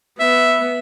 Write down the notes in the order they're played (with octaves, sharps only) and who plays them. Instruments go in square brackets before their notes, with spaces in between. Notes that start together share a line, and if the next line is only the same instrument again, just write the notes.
[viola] B3 [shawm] E5